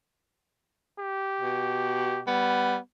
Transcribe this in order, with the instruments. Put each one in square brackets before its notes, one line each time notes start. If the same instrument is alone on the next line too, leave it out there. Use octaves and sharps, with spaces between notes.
[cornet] G4
[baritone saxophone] B2
[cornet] G3 [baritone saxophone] B3